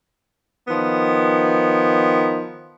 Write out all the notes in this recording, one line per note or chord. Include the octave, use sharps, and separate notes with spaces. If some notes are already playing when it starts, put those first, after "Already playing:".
D#3 F3 B3